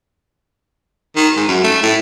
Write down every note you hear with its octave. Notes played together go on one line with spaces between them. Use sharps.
D#3
G#2
F#2
A3
A2